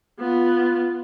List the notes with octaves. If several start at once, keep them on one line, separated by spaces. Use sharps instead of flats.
B3 F4